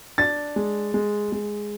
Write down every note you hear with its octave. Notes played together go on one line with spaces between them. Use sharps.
D4 A6
G#3
G#3
G#3